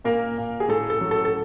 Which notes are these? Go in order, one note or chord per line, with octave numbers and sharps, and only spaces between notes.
A#2 A#3 A#4
A#2
G#4
A2 A4
A4
F#3
A4
A4